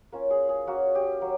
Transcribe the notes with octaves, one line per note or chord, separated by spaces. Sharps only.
A#3 C#4 F4
G#4
G#4
A#3 C#4 F4 F#4
G4
F#3